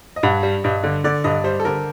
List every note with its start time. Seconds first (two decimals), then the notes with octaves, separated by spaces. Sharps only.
0.16 D#5
0.23 G2 F#5
0.43 G3
0.64 G2 D#5
0.84 D3
1.04 D3 D5
1.24 G2 D#5
1.44 G3 C5
1.60 A4
1.65 D3 A#4